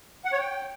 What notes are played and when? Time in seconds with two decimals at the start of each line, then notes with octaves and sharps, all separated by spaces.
0.25 F#5
0.32 C#5
0.40 G5